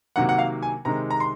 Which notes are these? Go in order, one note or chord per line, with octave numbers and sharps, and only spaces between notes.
C3 D#3 F#3 A#3 F#5
F#5
F5
G#5
C3 D#3 G#3 A#5
A#5
C6